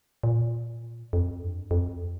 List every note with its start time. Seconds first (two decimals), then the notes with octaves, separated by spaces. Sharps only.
0.23 A#2
1.13 F2
1.42 G2
1.71 F2